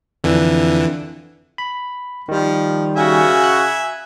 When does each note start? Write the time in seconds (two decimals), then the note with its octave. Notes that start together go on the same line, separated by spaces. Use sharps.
0.24 F2 D3 E3
1.58 B5
2.28 D#3 F3 G3
2.96 C#3 F#4 E5 G#5
3.44 F#6